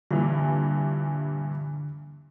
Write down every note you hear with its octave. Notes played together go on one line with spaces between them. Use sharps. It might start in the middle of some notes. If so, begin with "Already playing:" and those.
G2 A#2 D3 E3